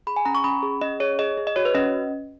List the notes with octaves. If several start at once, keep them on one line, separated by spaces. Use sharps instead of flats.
G#4 B5
G#5
C#4 A#5
C#6
C#4 B5
G#4
C#4 D#5
G#4 C#5
G#4 D#5
G#4
D#5
F#4 C#5
B4
C#4 D#5